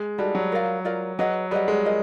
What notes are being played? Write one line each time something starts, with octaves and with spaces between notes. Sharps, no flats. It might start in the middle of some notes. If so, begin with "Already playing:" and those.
Already playing: G#3
G3 D#4 F#4 A4
F#3
F4 A#4 D5 F5
F4 A#4 D5 F5
F#3 G#4 B4 D#5 F#5
G3 G#4 B4 D#5 F#5
G#3
F4 A#4 D#5